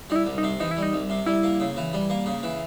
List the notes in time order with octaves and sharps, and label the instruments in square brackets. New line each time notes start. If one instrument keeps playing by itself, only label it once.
[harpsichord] G3 [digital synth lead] D#4
[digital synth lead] E4
[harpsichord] C2
[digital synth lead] D#4
[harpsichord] C3
[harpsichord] E3 [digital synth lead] D#4
[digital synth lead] E4
[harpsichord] G3
[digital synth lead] D#4
[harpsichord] C2
C3
[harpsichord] G3 [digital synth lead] E4
[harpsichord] A#3
C#3
E3
G3
A#3
C#3
E3